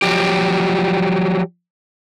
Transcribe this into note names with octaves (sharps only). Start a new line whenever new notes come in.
F3 F#3 G4